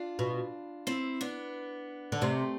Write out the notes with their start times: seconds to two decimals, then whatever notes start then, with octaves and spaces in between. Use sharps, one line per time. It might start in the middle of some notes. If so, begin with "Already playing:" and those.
Already playing: D4 F4
0.19 B2
0.87 C4 E4
1.21 B3 D4
2.12 D3
2.21 C3 A3 C4